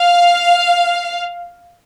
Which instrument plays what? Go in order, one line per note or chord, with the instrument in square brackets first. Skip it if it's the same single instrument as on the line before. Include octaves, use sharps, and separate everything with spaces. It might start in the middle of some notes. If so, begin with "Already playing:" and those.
Already playing: [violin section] F5